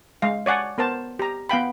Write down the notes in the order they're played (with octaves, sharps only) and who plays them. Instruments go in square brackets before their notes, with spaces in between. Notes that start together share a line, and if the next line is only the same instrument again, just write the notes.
[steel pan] G#3 F5
C#5 D5 F#5 G#5
B3 A#4 C5 A5
G4 A#5
B3 F5 G5 B5